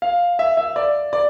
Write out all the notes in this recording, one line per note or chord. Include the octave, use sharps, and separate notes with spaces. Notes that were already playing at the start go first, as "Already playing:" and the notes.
F5
E5
E5
D5
D5